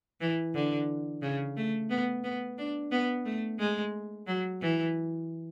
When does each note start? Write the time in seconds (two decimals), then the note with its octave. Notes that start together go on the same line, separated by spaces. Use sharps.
0.21 E3
0.55 D3
1.22 C#3
1.57 A3
1.90 B3
2.24 B3
2.58 D4
2.92 B3
3.25 A3
3.59 G#3
4.27 F#3
4.61 E3